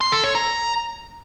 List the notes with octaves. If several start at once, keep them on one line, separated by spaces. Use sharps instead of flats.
C6
A4
C#5
A#5